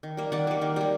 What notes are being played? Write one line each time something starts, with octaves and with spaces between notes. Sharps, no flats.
D#3
G3 A#3
D#3 D5 F#5
G3 A#3
D#3
G3 A#3